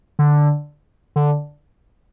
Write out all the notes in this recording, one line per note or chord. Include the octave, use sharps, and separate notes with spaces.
D3
D3